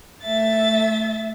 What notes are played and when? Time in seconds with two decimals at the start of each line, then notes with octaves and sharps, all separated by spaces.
0.24 A3 E5 A6